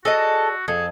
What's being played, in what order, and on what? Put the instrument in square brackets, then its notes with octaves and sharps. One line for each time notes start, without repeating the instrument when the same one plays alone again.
[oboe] F#4 [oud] G#4 D5 D#5 [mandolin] A4
[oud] F2 [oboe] G#4 [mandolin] A4